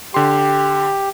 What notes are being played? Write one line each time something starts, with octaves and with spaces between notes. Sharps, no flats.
D3 G4 C6